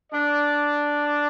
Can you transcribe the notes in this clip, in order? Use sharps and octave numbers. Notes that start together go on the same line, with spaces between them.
D4 D5